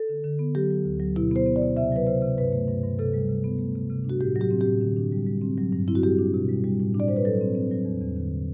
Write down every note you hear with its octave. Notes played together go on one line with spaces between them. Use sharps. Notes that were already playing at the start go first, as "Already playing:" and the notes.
Already playing: A4
D3
D3
B3
F#3 G4
F#3
D2
F#3
B2 E4
B3 C5
B3
D5
B2
C3 E5
F#3 B4
C3 C5
C3
G2 B4
A3
G2
G2
C3 A4
G3
C3
B3
A3
C3
C3
D4
F#4
A2 G4
F#3
G4
C4
A2 G4
D3
D4
G3
G3
C4
F#3
G2
C4 E4
F#4
G3 G4
D4
B2
G3
G3
A2
D4
D5
G3 C5
B4
F#3 A4
C4
C4
F#3
E2
E2
D3